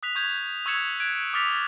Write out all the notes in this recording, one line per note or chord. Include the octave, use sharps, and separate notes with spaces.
D#6 F#6 B6 F7
C#6 G6 G#6 F7
C#6 E6 F#6 G#6 C#7 E7
F#6 G#6 D7
D6 D#6 F6 A6 B6 F7